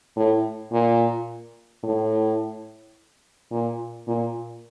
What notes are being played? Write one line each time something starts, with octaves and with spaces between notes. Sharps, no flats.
A2
A#2
A2
A#2
A#2